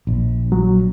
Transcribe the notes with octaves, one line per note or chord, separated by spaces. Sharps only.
A#1
F#3